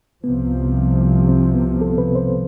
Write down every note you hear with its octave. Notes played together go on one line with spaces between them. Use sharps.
C2 C3 F3 B3
C4
B3
A4
B4
C5